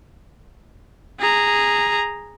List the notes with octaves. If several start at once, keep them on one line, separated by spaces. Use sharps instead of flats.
G#4 A#5